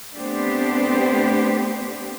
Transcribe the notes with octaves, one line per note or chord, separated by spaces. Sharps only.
A3 B3 C4 D4 G4 C5